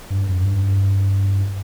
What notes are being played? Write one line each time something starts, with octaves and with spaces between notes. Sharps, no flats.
G2
F#2
G2